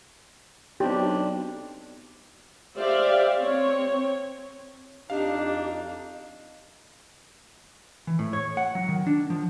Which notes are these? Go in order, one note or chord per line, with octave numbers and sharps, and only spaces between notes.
B1 C4 D4 G4
G4 C5 D5 E5 F5
C4 C#5
F2 D4 D#4 G4 F5
E3
A2
C#5
F#5
F#3
D#3
D4
F3